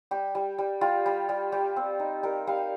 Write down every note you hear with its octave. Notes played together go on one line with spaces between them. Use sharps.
G3 G4
G3
G3
G3 F4
G3
G3
G3 G4
C4
D#4
G3 A#4
G3 F5